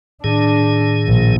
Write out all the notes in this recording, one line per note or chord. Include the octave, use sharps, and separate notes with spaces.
A2 D#3 D4 G#4
A#1